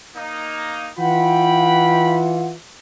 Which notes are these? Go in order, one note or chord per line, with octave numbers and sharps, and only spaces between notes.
A#3 D#4
E3 F4 F#5 G5 B5